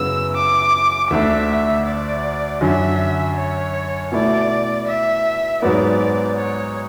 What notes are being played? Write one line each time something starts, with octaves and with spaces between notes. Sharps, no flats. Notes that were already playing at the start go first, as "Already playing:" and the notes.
Already playing: F#2 C#3 F#3 B3 E4 E6
D6
D2 D3 A3 D4 E5
D5
F#2 D3 F#3 E5
C#5
B2 A3 E4 D5
E5
G#2 F#3 B3 D5
C#5